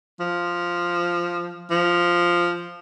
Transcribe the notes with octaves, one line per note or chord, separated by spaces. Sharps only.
F3
F3